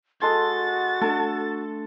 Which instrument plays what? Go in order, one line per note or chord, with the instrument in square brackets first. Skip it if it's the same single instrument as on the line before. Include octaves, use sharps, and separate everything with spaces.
[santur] G#3 A4 C6 [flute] F#4 [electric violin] A6
[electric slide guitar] A3 D4 A5 [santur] A4